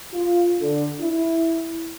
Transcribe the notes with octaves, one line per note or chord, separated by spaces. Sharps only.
F4
D3
E4